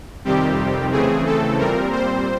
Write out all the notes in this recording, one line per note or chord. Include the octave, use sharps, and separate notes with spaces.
F2 C3 D#3 G3 C4 G4
C#3 E3 A3 C4 G#4
A4
A#2 G3 C4 A#4
C5